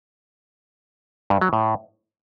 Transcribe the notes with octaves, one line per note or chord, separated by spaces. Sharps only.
G2
F#3
A2